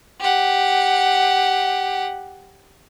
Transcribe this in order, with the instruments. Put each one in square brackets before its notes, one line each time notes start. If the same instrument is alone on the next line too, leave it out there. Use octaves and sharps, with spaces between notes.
[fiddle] G4 F#5